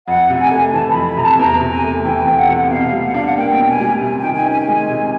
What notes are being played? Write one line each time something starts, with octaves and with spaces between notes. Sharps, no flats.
F2 F#5
C3
G#5
A3
E3 A5
F2 B5
B5
C3 A#5
A5
E2 A#5
C3
G#5
A3
E3 G5
G#5
E2 G5
F#5
C3
B2 F5
G3
F#5
D4 F5
F#5
A#3 G5
B2
G#5
G3
C3 G#5
D#3 G5
G#5
C#4
G#5
G#3
C3